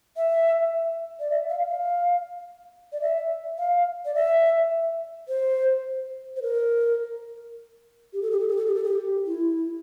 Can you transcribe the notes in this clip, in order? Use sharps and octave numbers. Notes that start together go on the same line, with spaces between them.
E5
D5
E5
F5
F5
D5
E5
F5
D5
E5
C5
C5
A#4
G4
A4
G4
A4
G4
A4
G4
A4
G4
E4